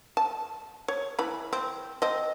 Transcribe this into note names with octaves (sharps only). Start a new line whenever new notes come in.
A5
C#5
E3 B5
C4
C4 D#5